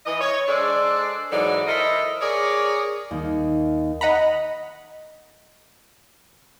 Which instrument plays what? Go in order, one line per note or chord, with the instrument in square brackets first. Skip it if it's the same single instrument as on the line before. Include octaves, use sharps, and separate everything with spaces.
[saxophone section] E3 D#5
C#5
G#3 D4 A4 C5 D5
G#2 E3 F#3 D#4 A4 D5
E4 A4 A#4 C5 D#5
G#4 A#4 C#5 D5
[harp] D#2
[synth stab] D#5 F#5 A#5 B5